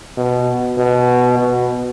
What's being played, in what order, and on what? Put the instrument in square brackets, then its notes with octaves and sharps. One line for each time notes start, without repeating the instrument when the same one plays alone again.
[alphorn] B2
B2
B2